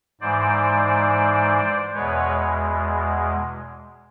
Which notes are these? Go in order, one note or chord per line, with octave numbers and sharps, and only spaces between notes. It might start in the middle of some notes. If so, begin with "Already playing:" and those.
G#2 E3 G#3 C5 D5
E2 B2 G#3 B4 C#5